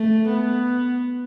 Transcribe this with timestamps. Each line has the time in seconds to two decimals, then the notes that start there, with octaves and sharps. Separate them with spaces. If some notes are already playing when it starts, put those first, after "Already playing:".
Already playing: A3
0.28 B3